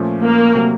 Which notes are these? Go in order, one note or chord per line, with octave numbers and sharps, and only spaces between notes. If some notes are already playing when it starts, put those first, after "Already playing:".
Already playing: A#2 F3 A3 C#4
A#3
C3 F#3 A3